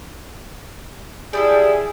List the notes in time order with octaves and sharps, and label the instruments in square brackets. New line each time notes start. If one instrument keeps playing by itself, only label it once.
[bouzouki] G3 E4 A4 [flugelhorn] G#4